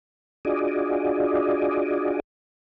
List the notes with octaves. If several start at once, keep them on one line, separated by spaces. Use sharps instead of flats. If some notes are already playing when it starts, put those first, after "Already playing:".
D4 F4 F#4 G#4 D5 D#5